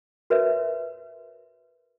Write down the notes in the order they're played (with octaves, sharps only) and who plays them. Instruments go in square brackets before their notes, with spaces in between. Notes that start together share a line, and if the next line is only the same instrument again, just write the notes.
[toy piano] F#4 A#4 B4 C#5 E5